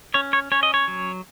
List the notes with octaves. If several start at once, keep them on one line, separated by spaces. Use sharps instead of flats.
C#4 C#5
C#5
C#4 C#5
D#5
C#5
F#3